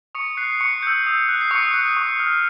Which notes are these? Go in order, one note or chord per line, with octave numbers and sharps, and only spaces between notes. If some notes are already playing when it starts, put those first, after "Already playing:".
C#6 D#6 C#7
F#6 C7
C#6 C#7
E6 G6
D#6
F#6
C7
C#6 D#6 C#7
F#6
C#6
F6